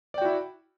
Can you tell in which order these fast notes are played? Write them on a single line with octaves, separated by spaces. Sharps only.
D5 G5 F#4 E4